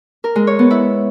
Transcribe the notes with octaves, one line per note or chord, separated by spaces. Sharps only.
A#4
G#3
C#5
B3
E4